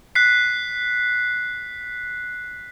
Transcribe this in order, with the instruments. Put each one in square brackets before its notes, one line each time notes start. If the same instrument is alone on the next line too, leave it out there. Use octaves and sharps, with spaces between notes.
[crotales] F#6 B6 C7